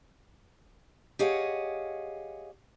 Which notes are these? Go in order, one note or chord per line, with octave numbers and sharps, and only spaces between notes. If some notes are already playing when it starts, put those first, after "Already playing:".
G4 G#4 C#5 D#5 F5 F#5